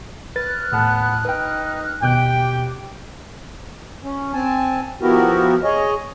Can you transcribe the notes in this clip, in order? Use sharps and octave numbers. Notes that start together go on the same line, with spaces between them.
B4 F6 F#6 A6
D#2 A2 B3 A5
D#4 B4 G5
D#2 B2 G4 G5 D6 F#6
C#4
C4 G#5 A5
F3 B3 E4 F#4 G4 A#4
G#4 C#5 D#5